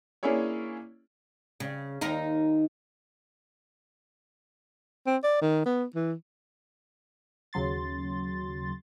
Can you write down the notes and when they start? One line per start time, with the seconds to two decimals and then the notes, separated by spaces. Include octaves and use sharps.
0.23 A#3 C#4 D4 E4 G#4 C#5
1.60 C#3
2.01 D#2 D#4 A#4
5.07 C4
5.23 D5
5.41 D#3
5.66 B3
5.95 E3
7.53 D#2 C#3 F#3 C6 A6